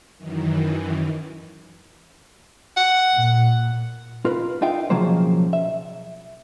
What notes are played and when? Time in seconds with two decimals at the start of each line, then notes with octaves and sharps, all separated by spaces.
0.17 F#2 D#3 E3
2.77 F#5
3.15 A#2
4.25 F4 A#4 B4
4.61 D4 D#4 F4 E5 G5
4.90 B1 C#3 F3 F#3 A#3 C5
5.53 E5